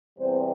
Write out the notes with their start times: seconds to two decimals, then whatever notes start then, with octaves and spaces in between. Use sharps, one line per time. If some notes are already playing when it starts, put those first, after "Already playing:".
0.17 E2 C3 G3 C4 C5